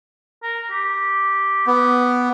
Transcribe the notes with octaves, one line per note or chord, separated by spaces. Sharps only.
A#4
G4
B3 D6